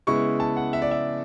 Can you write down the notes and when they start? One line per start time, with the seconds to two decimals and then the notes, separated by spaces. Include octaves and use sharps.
0.07 C#3 G#3 B3 E4 C#6
0.40 A5
0.57 F#5
0.73 E5
0.82 D5
0.91 E5